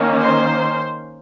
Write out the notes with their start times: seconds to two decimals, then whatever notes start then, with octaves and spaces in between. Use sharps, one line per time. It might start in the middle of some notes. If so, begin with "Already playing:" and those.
Already playing: D#3 A#3 C#4
0.20 C5